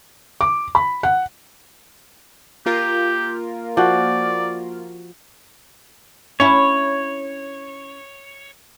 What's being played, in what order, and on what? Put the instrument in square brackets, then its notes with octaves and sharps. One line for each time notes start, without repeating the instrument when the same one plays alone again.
[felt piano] D6
B5
F#5
[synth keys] A#3 F4 A#4 [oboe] G4
[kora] F3 F#4 [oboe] D5
[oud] C#4 E4 [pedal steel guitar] C#5